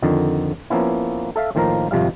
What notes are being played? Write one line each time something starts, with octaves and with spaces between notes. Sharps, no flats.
F2 D3 D#3
F3 A#3 B3 C#4 E4
A4 E5 F5
A2 D#3 F3 A#3 F5 A#5
G#1 F2 C3 F3 G3 F5